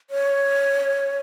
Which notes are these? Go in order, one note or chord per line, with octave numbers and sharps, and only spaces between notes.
C#5